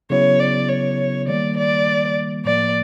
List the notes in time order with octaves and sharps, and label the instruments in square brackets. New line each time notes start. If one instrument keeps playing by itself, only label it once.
[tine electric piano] C#3 F#3 B3 E4 [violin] C#5
[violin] D5
C#5
[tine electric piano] D#3 G3 A#3 [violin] D5
[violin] D5
[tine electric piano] A2 F3 A#3 [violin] D5